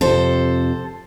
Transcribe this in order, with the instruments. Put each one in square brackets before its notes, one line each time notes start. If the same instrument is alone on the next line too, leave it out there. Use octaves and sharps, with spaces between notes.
[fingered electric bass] F2 C3 [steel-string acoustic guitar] A4 C5